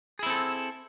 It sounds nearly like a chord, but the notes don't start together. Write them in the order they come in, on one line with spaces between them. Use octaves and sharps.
G#4 E4 C4 A4